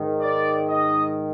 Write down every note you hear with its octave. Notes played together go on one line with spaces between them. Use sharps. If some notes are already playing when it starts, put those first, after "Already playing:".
Already playing: G#2 D#3
D5
D#5